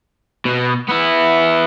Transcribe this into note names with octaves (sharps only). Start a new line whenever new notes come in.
B2
B3 E4